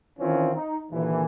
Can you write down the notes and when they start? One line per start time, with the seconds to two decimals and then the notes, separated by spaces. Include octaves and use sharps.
0.19 D#3 E3 C4 C#4 F4
0.55 D#4
0.91 D#2 A#2 D3 E3